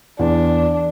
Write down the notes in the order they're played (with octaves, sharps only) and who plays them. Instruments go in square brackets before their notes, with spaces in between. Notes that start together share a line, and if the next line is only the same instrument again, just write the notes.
[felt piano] E2 [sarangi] D4